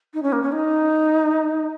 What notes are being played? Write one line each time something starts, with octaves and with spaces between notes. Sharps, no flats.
D#4
C#4
A#3
C#4
D#4